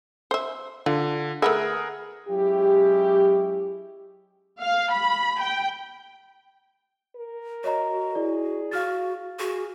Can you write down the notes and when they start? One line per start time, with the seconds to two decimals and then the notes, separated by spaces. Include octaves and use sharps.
0.31 C5 E5
0.86 D3 F4
1.42 A3 G#4 A#4 B4 E5 F#5
2.29 F#3 G#3 C#4 E4 G4
4.62 F5
4.92 B5
5.41 G5
7.16 A#4
7.64 F#4 C#5 D#5 A#5
8.15 E4 G#4 D5
8.71 F#4 F5 F6 A6
9.39 F#4 G#4